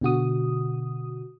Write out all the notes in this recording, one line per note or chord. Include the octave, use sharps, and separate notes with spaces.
B2 D3 F#4 D#6